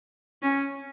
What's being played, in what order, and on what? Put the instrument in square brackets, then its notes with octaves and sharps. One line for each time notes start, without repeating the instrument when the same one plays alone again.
[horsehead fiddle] C#4